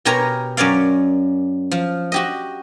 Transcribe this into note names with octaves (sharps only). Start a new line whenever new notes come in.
B2 G4 A#4 C#5 G#5 A#5
F#2 C#4 C#5 D5 F5
F3
F#4 G4 D#5